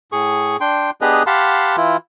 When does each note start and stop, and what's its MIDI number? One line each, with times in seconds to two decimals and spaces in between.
0.12 0.57 45
0.12 0.57 68
0.12 0.57 85
0.61 0.90 62
0.61 0.90 79
0.61 0.90 84
1.01 1.23 59
1.01 1.23 62
1.01 1.23 67
1.01 1.23 68
1.01 1.23 71
1.01 1.23 75
1.27 1.76 67
1.27 1.76 77
1.27 1.76 78
1.27 1.76 81
1.27 1.76 83
1.27 1.76 84
1.77 1.97 52
1.77 1.97 64
1.77 1.97 65